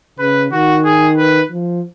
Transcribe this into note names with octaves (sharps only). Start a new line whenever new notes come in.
C#3 B4
D#3 F#4
G#4
B4
F3